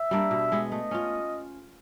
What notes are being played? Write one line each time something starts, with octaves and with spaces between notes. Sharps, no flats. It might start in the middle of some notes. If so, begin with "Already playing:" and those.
Already playing: E5
G3 A#3 D4
B2
G#3 B3
A3 D#5
C#4 F4